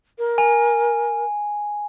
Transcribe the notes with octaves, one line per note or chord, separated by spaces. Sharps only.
A#4
G#5